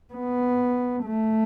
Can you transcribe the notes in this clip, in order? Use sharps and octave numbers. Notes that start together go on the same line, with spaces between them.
B3
A3